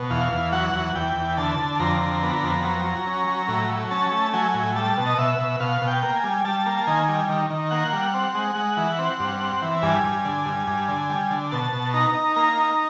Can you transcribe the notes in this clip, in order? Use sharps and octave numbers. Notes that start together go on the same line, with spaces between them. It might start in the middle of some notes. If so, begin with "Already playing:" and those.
Already playing: B2
E2 F5
E2
F#3 F#5
E2
E2 G5
E2
D3 A5
D3
F2 A#5
D3
B3
F2
F#3
F#3
C#4
F#3
A2
F#3
C#4 A5
A3
F#3 G#5
A2
G3 A5
B2
D#5
B2 E5
B2
B2 F5
B2
G5
A#3
G#5
G3
G3 A5
A#3
D#3 G#5
G3
D#3
D#3
A#3 F#5
G3
C4
G#3
G#3
E3
C4
G2
C4
E3
G2 G#5
G2
D3
G2
G2
D3
G3
D3
B2 A5
B2
D#4 A#5
D#4
A#3 A#5
D#4